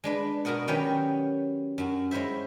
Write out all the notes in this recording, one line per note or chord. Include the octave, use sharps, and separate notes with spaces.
G#3 D4 B4
B2 F#4 A#4 D#5 F#5
D#3 F#3 C#4 G4 B4 C#5
F#2 F#4
G#3 C#4 E4 C5 E5